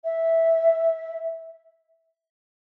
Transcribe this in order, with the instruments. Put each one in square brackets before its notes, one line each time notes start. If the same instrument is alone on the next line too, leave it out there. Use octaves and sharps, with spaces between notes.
[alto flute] E5